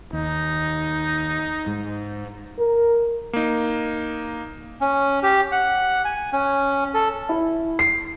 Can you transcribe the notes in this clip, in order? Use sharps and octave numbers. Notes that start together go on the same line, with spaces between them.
D#2 D#4
G#2
A#4
A#3 D#4
C#4
G4
F#5
G#5
C#4
A4
E4
C7